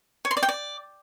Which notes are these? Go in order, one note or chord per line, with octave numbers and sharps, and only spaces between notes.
C#5
C6
D5
G5
D5